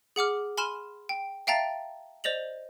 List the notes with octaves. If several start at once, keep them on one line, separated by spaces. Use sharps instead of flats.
G#4 F#5 D6 F6
G#5 B5 C6 F6 E7
G5
E5 F5 G5 A5 A#5 A6
C5 D5 D#5 F7 F#7